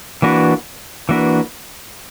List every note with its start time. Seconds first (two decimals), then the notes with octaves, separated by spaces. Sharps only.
0.22 E3 A#3 D4 F#4 B4
1.09 E3 A#3 D4 F#4 B4